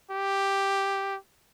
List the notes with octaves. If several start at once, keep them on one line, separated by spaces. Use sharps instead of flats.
G4